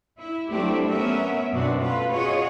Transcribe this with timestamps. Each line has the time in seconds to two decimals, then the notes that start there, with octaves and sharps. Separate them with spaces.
0.19 E4
0.49 F#3 A3 C4 D4 E4 G4
0.88 B3 C#4 A#4 E5
1.52 F#2 B2 C4 D4 F#4
1.81 A3 F4 B4
2.12 F4 F#4 G#4 C#5 D#5